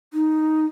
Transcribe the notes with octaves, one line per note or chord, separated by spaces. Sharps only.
D#4